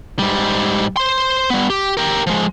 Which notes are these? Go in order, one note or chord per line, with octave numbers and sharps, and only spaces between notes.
G#2 G3
C5 C6
G3 B3
G4
G4 A#4
F3 G#3